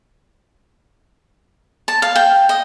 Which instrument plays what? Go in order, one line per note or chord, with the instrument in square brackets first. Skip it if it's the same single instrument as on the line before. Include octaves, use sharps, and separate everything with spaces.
[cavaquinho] A5
F5
G5
D#5